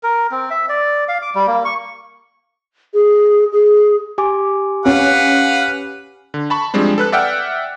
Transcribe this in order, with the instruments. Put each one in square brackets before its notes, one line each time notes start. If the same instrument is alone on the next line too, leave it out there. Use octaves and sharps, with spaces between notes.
[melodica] A#4
C4
E5
D5
F5
D6
G3
A#3
C#6
[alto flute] G#4
G#4
[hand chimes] G4 G#5 D6
[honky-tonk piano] C#4 [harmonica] B4 F5 F#5
[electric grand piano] D3
A5 B5 C#6
F3 G3 G#3 C4 D4
A4 B4 F#6
D5 E5 F#5 G5 E6 F6